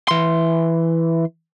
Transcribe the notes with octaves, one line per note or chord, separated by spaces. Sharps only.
E3 C6